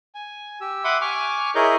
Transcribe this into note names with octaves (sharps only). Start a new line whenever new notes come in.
G#5
G4 E6
E5 F#5 B5 C6 D6 D#6
G#5 C#6 D6 F6
E4 G#4 A#4 C#5 D#5 G6